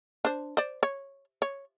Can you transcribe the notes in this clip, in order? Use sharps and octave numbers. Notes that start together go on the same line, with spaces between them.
D4 C5
C5 D5
C#5
C#5